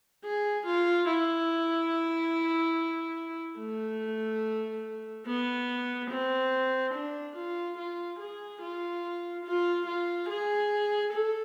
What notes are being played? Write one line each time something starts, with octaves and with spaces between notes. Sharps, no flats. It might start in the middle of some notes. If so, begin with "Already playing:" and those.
G#4
F4
E4
A3
B3
C4
D4
F4
F4
G#4
F4
F4
F4
G#4
A4